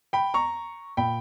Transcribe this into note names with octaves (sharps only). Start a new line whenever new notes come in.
G5 B5
A#5 C#6
A#2 G5 B5